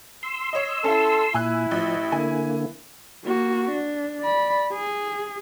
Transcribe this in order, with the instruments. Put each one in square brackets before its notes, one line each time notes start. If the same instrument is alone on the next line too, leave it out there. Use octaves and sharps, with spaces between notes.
[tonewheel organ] C6 E6
[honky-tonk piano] C#5 D#5
[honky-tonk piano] C#4 E4 [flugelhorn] A4
[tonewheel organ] A#2 [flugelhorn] E4 [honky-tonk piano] G#5 E6 F#6
[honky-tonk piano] A1 [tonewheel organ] F3
[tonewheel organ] D3 A#3 [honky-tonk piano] G#5
[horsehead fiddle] A#3 F#4
D4
D5 B5
G#4